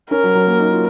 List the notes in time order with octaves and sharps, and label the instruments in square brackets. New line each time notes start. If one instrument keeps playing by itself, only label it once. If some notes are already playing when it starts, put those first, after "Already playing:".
[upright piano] C#4 [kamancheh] A#4
[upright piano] F#3
F#3
A#3
D#4
F4